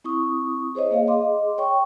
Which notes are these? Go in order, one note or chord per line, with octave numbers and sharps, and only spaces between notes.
C4 E4 C#6 D#6
G#4 C5 C#5 D#5
A#3 G#4 F5
G#4 D#5 C6 D6
C#5 G5 C#6